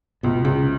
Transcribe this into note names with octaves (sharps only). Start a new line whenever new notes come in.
C#2 B2
C#2 C#3